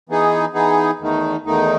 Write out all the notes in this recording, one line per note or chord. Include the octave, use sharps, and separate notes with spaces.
E3 B3 D#4 G#4
E3 B3 D#4 G#4
E2 D#3 A3 D#4
E2 D#3 A3 D#4